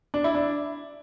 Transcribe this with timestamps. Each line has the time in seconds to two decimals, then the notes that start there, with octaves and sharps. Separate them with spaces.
0.14 D4
0.24 E4
0.34 D4